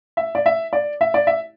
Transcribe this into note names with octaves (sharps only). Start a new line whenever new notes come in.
E5
D5
E5
D5
E5
D5
E5